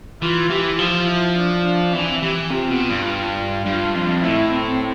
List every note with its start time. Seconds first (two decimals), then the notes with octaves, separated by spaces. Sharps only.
0.22 E3 F4
0.50 E3 G4
0.79 F3 F4
1.07 E4
1.37 D4
1.65 D4
1.93 E3 C4
2.23 E3 G4
2.51 C3 F4
2.71 B2
2.90 G2
3.66 G2 F4
3.95 F2
4.23 A2 E4
4.53 C4